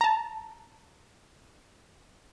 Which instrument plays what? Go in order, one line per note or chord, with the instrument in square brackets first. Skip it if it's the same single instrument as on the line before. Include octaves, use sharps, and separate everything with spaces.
[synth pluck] A5 A#5